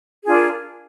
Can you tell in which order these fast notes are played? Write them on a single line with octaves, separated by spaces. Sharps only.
G#4 D4 F4 A#4